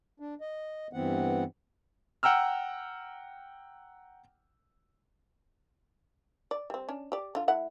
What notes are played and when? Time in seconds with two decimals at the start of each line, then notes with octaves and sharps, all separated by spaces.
0.20 D4
0.41 D#5
0.93 G2 E3 B3 C4 F#5
2.23 F#5 G5 A#5 E6 F6
6.51 D5
6.70 G3 C4
6.89 C#4 D4
7.12 G4 D5
7.35 D3 F4
7.48 A3 E4 F#5